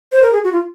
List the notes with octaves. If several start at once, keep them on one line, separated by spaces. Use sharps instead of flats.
C5
A#4
G#4
F#4
F4